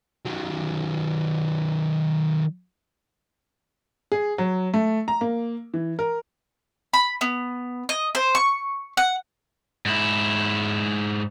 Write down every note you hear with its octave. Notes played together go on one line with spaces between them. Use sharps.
D#3 F#3
G#4
F#3
A3
A#5
A#3
E3
A#4
B5
B3
D#5
C5
C#6
F#5
G#2 E4